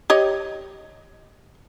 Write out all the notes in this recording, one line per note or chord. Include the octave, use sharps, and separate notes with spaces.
G4 C#5 D#5